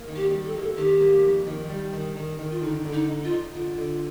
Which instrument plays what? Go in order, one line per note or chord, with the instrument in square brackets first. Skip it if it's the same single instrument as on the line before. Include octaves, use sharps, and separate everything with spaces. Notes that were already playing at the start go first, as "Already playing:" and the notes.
Already playing: [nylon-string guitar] A#3
D#3
[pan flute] G4
[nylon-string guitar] G3
[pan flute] A4
[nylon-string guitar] A#3 [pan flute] G4
[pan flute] A4
[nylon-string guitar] D#3 [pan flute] G4
[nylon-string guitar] A#3
F2
D#3
G3
D#3
D#3
D#3
[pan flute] F4
[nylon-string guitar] D3 [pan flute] D#4
[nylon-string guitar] D3
[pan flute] D#4
[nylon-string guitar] D#4
[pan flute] F4
[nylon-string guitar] D#4
[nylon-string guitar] D3 [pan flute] F4
[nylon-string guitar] D3